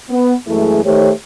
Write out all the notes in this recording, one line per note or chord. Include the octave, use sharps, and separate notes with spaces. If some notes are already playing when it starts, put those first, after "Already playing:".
B3
F#2 E3 G#3 A3 E4 G#4
D#3 A3 G4 C5 C#5